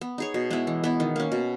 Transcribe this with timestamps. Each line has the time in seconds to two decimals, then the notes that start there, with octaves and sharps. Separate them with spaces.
0.01 B3
0.18 D#4 G#4 C#5
0.34 B2
0.50 G#3 B3 E4
0.67 E3
0.84 B3 E4
1.00 D#3
1.16 A#3 C#4
1.32 B2